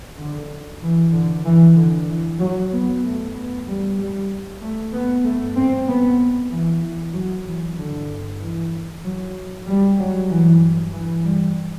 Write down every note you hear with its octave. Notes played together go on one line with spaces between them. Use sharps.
F#2 D3
E3
D3
E3
D3
E3
F#3
F#2 B3
A3
B3
G3
G3
A3
B3
G2 A3
C4
B3
E3
E3
F#3
E3
G2 D3
E3
F#3
G3
F#3
G2 E3
E3
G3